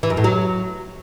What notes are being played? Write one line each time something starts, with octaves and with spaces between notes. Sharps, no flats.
E3
F#2
A2
F#3